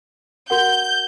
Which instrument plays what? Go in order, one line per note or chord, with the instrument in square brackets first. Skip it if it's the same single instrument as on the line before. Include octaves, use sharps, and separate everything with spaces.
[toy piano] F#4 A#4 F#5 [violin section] G6